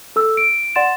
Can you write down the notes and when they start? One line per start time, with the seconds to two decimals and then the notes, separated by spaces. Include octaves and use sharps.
0.16 A4 E6
0.37 D7
0.75 D5 F#5 C6 A6 E7